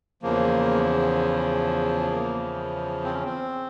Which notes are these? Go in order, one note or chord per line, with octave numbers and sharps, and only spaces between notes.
E2 C#3 F3 A#3
A#3
C4
C#4
C4